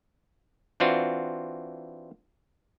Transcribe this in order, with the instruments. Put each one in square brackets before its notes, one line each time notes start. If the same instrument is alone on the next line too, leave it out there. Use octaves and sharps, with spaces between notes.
[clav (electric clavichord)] E3 C4 D4 F4 F#4